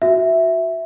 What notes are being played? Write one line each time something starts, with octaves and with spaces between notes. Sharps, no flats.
F#4 E5